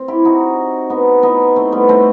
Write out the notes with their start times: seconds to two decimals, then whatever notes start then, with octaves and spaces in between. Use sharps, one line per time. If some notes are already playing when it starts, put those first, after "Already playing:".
Already playing: C4
0.08 E4 G4
0.25 D#4 F#4
0.90 B3 D#4
1.23 B3 D#4
1.56 A3 C4
1.72 G3 B3
1.89 A3 C4